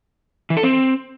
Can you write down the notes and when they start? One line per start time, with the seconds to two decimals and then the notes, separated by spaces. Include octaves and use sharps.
0.50 E3
0.57 A4
0.63 C4